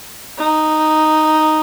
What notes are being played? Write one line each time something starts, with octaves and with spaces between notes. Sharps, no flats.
D#4